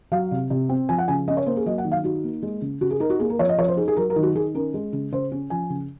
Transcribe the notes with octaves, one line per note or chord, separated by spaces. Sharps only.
F#3 F5
C3
C3
C4
F3 G#5
F#5
C#3 G#5
C#4 D#5
C#5
A#3 C5
G#4
F#3 D#5
F#5
D#3
F5
D#4 F#4
A#3
G#3
C#3
C#3 F#4
G#4
D#4 A#4
F#4
A#3 G#4
A#4
F3 C#5
D#5
F3 C#5
C5
D#4 G#4
G#4
F#3 A#4
A#4
D#3
F#4
D#3 G#4
C#4 A#4
G#3
C#3
C#3 C5
C#4
F3 G#5
C#3